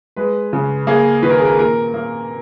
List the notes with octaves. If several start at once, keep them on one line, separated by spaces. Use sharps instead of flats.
G#3 B4
C#3
A#3 G#4
D#3 B4
A#4
G#4
A#4
A#2 A#4
A#3